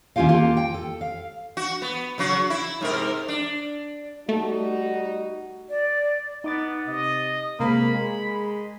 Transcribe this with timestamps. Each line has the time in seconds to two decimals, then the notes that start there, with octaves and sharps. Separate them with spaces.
0.16 D#2 C#4 E4 F4 G4 F5
0.28 A#3 F4 G4 A4
0.57 G5
0.74 A4
1.01 F5
1.57 F#4
1.82 B3
2.18 C#3 F#3 F#4
2.50 E4
2.81 G#2 C3 A#4
3.28 D4
4.29 G3 A3 D#4 F#4
5.70 D5
6.44 B3 D#4 D6 A6
6.87 C3 D#5
7.60 C3 G#3 A#3 C4 B5
7.94 G#3 A#4